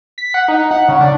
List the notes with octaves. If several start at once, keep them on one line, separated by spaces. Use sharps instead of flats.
B6
F#5
D#4
F#5
C#3
D4